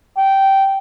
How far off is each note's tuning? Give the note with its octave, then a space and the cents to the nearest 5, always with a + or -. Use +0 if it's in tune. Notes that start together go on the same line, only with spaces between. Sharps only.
G5 -15